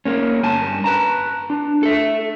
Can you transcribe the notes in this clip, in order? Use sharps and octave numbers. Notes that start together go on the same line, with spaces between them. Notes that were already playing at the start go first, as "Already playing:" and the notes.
A#3 C#4
G2 G#5 A5
B4 A5 A#5
D4
A4 E5